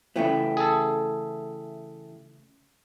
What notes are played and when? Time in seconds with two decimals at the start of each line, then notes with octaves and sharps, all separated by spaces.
0.16 C#3 E3 A3 B3 E5 G5
0.57 G#4 A4